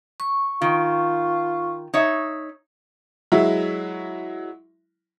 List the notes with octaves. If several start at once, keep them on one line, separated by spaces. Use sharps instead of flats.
C#6
D#3 F4
D#4 C#5 E5
F#3 G#3 E4 E5